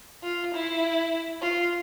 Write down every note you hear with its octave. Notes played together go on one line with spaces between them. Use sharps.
F4
E4
F4